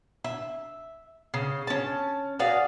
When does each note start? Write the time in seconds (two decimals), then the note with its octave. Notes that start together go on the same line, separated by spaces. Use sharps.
0.24 E5
1.34 C#3
1.67 C#4 A5
2.39 F#4 G#4 D5 F5